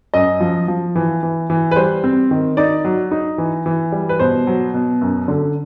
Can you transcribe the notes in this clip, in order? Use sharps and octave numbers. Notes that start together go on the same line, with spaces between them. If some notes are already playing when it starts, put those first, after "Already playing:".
F#2 D#5
F3
F3
E3
E3
E3
B4
G3 C5
C4
D#3
D#4 D5
F#3
D#4
E3
E3
G3
B4
B2 C5
F#3
B2
F#2
D3